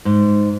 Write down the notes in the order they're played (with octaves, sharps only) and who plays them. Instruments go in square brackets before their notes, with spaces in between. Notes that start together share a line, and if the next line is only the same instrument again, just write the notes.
[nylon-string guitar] G#2